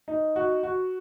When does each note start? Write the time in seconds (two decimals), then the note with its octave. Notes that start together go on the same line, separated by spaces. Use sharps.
0.08 D#4
0.36 F#4
0.63 F#4